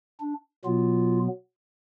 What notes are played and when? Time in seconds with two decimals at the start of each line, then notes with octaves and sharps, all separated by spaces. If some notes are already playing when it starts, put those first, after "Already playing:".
0.20 D4
0.65 B2 F#3 B3 F4